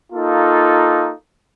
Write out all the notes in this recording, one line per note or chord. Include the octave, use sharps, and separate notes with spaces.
A#3 D#4 F4 A4